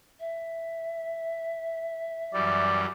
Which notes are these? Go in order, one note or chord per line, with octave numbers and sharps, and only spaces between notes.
E5
F#2 E3 G3 D5